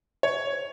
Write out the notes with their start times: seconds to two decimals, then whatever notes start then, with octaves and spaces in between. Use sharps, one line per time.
0.23 C#5